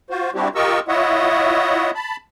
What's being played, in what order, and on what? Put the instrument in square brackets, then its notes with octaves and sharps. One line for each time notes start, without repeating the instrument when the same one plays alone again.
[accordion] F4 F#4 C5
G3 C4 D4 E4 F#4 G4
F4 G4 A#4 D#5 C#6 E6
E4 F4 C#5 D#5 E5 F#5
A5 B5